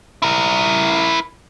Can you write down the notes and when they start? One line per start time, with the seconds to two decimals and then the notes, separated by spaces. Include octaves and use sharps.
0.22 E4 A#4